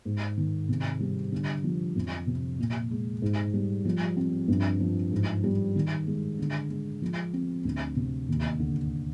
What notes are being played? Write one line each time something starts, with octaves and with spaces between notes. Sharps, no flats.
G#2
D#3
C3
G3
D3
F3
F2
C3
A#2
G#3
G#2
G3
F3
C4
G2
F3
G#2
G3
D#3
G#3
D3
G#3
F3
C4
D2
C3
D#2
D3